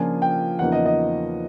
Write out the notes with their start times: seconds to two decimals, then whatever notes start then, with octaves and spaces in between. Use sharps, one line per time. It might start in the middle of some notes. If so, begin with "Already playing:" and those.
Already playing: C#3 F3 A#3 D4 F4 G#5
0.22 G5
0.59 E2 C#3 F3 A#3 D#4 F#5
0.72 D#5
0.85 D#5